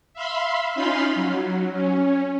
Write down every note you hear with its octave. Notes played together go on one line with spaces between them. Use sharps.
E5 F5 B5 C6
C#4 D#4 F4 F5 B5 C6
F#3
C#4